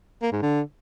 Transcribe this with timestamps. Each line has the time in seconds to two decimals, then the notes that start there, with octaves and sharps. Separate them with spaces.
0.22 A#3
0.32 G#2
0.42 D3